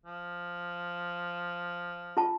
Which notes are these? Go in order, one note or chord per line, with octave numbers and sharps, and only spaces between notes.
F3
F4 A5